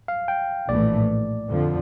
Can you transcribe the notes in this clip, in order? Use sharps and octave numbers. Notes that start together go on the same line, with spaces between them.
F5
G5
A#1 A2 E3 A3 D5
F2 D3 F3